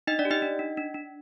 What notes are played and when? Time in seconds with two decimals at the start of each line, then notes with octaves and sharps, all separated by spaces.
0.07 D4 D#4 D#5
0.19 D4 D5
0.25 G4
0.31 D#4 D#5
0.42 D4
0.59 D4
0.77 D4
0.94 D4